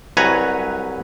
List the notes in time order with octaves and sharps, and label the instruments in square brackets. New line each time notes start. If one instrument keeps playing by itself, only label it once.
[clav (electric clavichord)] C2 F#3 B4 C#5 G#5 A#5